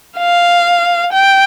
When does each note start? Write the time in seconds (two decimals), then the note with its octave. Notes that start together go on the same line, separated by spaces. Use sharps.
0.18 F5
1.13 G5